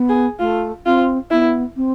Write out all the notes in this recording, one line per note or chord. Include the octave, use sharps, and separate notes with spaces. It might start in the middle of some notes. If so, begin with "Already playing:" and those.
Already playing: B3
G#4
A3 F4
C4 F4
B3 E4
C4